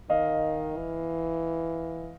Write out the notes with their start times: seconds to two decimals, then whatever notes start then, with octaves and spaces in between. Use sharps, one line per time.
0.10 D#3 D#5 F5
0.77 E3